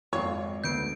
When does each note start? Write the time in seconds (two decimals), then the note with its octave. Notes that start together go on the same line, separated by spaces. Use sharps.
0.13 G#1 F2 F4 C5 C#5 C7
0.64 D2 B3 G6 C7 D7